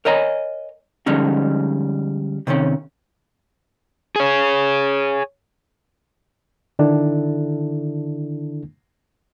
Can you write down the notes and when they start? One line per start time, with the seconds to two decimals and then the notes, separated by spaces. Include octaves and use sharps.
0.05 A#4 C#5 D#5 G#5 A#5
1.06 D3 F3 G3 G#3 C#4 D#4
2.47 C3 D#3 C4 C#4
4.16 G#4 C#5
6.79 D3 D#3 D4 E4 A4